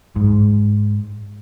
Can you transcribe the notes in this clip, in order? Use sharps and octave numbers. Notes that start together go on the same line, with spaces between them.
G#2